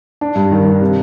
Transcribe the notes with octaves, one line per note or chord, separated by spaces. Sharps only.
D4
G2
D#3
D4
C3